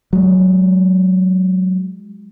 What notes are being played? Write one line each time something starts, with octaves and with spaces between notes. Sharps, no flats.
F#3 G#3